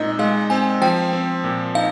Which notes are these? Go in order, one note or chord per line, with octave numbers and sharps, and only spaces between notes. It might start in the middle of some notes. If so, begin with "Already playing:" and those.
Already playing: A#2 G#3 C4 D#4 D#5
G#3 F5
C4 G#5
F3 G5
C4
A#2
D#4 F5